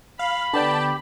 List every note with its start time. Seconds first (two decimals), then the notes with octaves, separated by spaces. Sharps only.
0.19 F5 B5
0.53 D3 B3 D4 G4 G5 A5